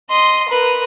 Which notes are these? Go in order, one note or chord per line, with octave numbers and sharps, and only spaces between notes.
D#5 C6
A#4 B4